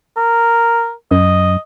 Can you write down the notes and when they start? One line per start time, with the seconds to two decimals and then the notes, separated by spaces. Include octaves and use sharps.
0.16 A#4
1.11 F#2 D#5